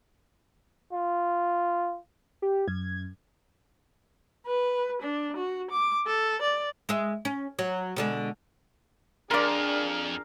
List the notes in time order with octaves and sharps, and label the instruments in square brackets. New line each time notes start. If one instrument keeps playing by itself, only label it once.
[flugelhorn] F4
[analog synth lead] G4
[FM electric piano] F#2 [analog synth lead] G#6
[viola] B4
D4
F#4
D6
A4
D5
[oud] G#3 G#4 E5
C#4
F#3
B2 D3 G#3
[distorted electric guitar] F2 [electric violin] D4 G#4 [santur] A#4 F5 [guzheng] D5 C6